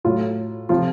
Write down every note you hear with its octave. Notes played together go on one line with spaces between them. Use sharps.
A2 F#3 F4
C3 F3 F4